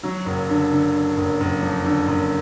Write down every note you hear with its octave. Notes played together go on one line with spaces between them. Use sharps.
F#3
F#1
D3
D3
D3
F#1
F#1
F2
D3
F#1